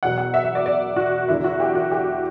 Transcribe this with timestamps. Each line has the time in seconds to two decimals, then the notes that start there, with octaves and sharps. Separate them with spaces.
0.03 E2 B2 F#3 F#5
0.18 F#5
0.34 E5
0.44 E5
0.55 D5
0.66 D5
0.96 F#4
1.28 E2 D3 F#3 E4
1.44 F#4
1.60 G4
1.75 F#4
1.92 G4